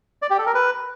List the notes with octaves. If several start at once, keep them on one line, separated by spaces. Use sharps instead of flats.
D5
G4
A4
A#4
B4